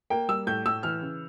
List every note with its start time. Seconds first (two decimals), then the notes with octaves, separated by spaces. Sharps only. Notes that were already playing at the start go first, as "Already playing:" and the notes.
0.10 A#3 G5
0.28 G3 E6
0.47 A2 G6
0.66 A2 E6
0.83 E3 F6
1.02 C#3